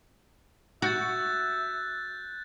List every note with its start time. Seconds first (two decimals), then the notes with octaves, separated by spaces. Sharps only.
0.82 F#4 E5 F#6 G6 A6